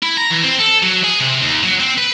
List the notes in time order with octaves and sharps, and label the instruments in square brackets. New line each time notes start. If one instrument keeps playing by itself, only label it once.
[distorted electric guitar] E4
A#5
E3
C4
A4
F#3
G#4
C3
D#2
F#3
C4
B4